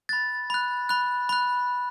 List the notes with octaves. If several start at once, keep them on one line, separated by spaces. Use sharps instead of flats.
B5 F#6 A6
B5 F#6
B5 F#6
B5 F#6